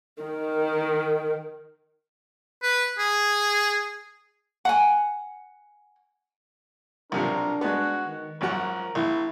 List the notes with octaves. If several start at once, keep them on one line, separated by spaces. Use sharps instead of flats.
D#3
B4
G#4
F#5 G#5
B1 C3 F3 D4 A#4
G#3 B3 F#4
D#3
G#1 F#2 F3 F#4 A#4
A#1 E4